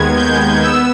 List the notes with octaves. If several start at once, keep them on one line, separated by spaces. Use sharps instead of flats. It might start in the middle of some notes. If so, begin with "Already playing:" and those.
Already playing: D#2 D#3 G#3 B3 G#6
G6
B3 E6